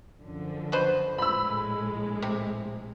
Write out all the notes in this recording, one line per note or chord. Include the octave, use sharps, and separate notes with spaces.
F#2 D3 F3
B2 B4 C5
A#1 A2 G#3 B5 E6
C3